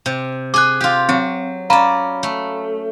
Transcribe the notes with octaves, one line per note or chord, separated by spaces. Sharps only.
C3
G#4 G#5 D6 F#6
F4 G4
F#3 C4
C#4 D5 F5 A#5 B5
A3